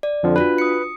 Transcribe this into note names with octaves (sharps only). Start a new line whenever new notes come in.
D5
F2 D3 F3
D4 F4 F#4 B4
D#6 C#7